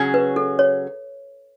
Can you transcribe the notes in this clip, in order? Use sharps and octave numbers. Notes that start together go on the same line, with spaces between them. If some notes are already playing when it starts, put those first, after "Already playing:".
Already playing: C#3 F#3 C#4 G#4
B4
A4
C#5